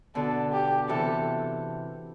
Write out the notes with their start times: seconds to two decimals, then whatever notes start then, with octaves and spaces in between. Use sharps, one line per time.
0.15 B2 D3 A4
0.53 G4
0.89 C3 E3 A4